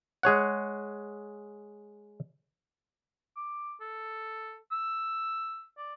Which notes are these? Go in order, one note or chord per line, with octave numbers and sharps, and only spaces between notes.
G#3 G#4 C#5 F#5
D6
A4
E6
D5